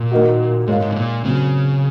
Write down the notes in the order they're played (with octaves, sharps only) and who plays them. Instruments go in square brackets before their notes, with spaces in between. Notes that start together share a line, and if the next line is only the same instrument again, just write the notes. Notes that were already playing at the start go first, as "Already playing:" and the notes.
Already playing: [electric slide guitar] A#2
[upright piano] D#3 A#3 D#4 F#4
[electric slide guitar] G#2 [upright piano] G#3 D#4 A#4 C#5 F5
[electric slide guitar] G#2
C3
A#2
[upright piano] A#2 F#3 C4 [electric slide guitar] C#3